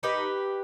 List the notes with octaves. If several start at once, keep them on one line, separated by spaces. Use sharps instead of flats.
D#4 G4 B4